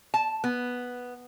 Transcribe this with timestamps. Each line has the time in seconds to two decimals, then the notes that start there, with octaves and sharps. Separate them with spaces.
0.14 A5
0.44 B3